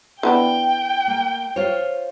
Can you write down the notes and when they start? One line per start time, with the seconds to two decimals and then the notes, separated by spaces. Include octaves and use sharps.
0.23 E3 B3 D4 G5
1.07 A#3
1.56 F4 C5 C#5